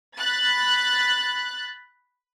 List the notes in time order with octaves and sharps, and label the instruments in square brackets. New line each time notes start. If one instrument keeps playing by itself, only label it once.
[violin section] B5 F#6 A6